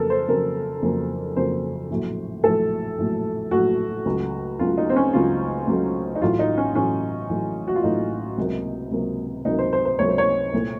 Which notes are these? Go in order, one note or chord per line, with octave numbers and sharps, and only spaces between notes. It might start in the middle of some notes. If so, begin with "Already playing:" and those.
Already playing: F2 C#3 F#3 A#3 A4 A#4
C5
F2 C#3 F#3 A#3 A#4
F2 C#3 F#3 A#3
F2 C#3 F#3 A#3 C5
A#1 A2 F#3 A3
A#1 A2 F#3 A3 A4
A#1 A2 F#3 A3
A#1 A2 F#3 A3 F#4
C#2 C#3 F#3 A3
C#2 C#3 F#3 A3 F4
D#4
C4
C#4
C#2 C#3 F#3 A3 F4
C#2 C#3 F#3 A3
D#4
A1 A2 F#3 F4
D#4
C#4
A1 A2 F#3 C#4
A1 A2 F#3
F#4
F4
A1 A2 F#3 D#4
C#2 C3 F#3 A#3
C#2 C3 F#3 A#3
C#2 C3 F#3 A#3 D#4
C5
C5
C5
C#2 C3 F#3 A#3 C#5
C5
C#5
C2 A#2 A3